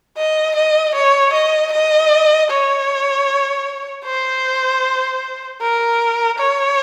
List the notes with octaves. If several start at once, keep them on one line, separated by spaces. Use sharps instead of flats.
D#5
D#5
C#5
D#5
D#5
C#5
C5
A#4
C#5